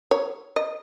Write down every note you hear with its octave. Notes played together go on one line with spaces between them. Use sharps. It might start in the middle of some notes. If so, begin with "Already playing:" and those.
C#5
D#5